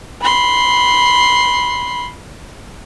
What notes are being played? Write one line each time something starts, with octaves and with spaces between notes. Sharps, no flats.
B5 C6